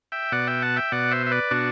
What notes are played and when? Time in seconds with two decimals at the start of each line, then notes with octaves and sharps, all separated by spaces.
0.12 E5 G5
0.32 B2 D5 F#5
0.47 E5 G5
0.62 F#5 A5
0.76 E5 G5
0.92 B2 D5 F#5
1.11 C5 E5
1.26 E5
1.31 B4 D5
1.51 B2 D4 F#4